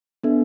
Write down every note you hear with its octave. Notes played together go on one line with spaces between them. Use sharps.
B3 D4 A4 E5